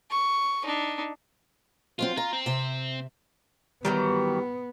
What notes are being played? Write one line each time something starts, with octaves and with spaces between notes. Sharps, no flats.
C#6
D4 D#4
F3 F#3 C4 F4
F4 A#5
C4
C3 E5
D#3 E3 F#3 G3 B3